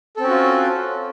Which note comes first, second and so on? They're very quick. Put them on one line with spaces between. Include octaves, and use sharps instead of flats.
A4 C4 C#4 F#4 F4